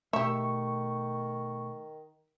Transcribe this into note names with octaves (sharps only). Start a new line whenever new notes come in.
B2 D#3 A3 G4 E5 C#6